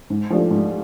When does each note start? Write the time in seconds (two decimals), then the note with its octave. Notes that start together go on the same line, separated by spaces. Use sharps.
0.10 G#2
0.30 F3 A3 D4 G4
0.51 G#2